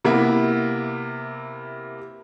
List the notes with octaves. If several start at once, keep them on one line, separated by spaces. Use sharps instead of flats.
C3 A#3 B3 E4